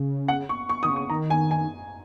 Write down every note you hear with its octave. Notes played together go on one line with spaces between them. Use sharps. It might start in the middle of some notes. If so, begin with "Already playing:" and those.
Already playing: C#3
F#5
C#6
C#6
D#3 D#6
C#3
C#6
D#3 A#5
G#5
G#5